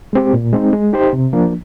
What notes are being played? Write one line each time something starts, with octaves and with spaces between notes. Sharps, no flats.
G#3 C4 G4
A#2
G#3 C4 D#4
G#3
D#4 G4 C5
C3
F3 A#3 D4